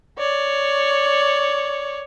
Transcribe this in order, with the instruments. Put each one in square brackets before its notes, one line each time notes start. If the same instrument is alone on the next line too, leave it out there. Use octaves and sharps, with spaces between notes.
[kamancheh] C#5 D5